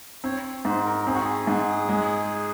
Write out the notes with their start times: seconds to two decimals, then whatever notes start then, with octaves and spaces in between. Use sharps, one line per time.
0.24 C4 C#5
0.65 G#2 C5
0.86 A#4
1.07 C4 G#4
1.15 F#4
1.25 G#4
1.47 G#2
1.89 G#3